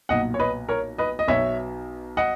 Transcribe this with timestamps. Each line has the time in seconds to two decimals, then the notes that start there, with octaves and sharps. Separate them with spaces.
0.09 B1 A#2 D#5 F#5
0.34 C#5
0.39 B4 D#5
0.69 A#4 C#5
0.98 B4 D#5
1.19 D#5
1.28 B1 B2 C#5 E5
2.17 D#5 F#5